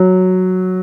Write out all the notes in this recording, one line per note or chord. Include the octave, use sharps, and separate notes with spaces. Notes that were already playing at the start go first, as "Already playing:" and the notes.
Already playing: F#3